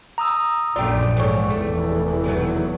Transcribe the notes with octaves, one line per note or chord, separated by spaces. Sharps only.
A#5 D#6 E6
A#1 F#2 A3 D4 F4 D5 G5
G#2 E3 A4 C#5
F1 E2 E3 A3
B2 D#3 F#3